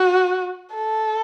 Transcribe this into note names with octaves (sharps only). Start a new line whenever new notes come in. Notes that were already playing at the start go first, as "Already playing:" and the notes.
Already playing: F#4
A4